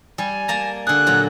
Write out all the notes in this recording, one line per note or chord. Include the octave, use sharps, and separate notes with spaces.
G3 G#5
A#3 A5 A#5
D3 G#4 F#6
A#2 F#3